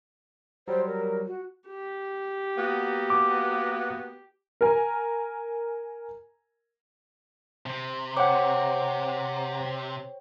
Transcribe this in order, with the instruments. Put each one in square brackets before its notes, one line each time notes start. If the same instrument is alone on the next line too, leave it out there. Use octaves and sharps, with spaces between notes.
[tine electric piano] F#3 G3 [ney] C5
[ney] A#4
F#4
[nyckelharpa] G4
[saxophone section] A#3 B3 F#4
[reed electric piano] D6
[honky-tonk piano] A#4 G#5 A#5
[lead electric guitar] C3
[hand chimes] C5 C#5 G5 [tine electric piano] F#5 D6